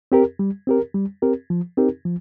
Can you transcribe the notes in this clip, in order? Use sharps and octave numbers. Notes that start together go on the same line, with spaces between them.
C4 G4 A#4
G3
C4 G4 A#4
G3
C4 G4 A#4
F3
C4 D#4 G4 A#4
F3